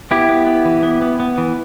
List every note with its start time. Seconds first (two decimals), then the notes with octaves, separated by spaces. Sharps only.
0.11 B3 E4 G4
0.29 B3
0.47 B3
0.65 E3
0.83 B3
1.02 B3
1.20 B3
1.38 E3